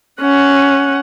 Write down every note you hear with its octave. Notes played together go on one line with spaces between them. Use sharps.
C#4 F#5